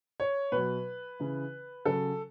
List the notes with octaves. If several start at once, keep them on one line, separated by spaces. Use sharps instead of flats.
C#5
B2 F#3 B4
C#3 E3
C#3 F#3 A4